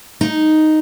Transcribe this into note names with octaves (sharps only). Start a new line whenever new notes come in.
D#4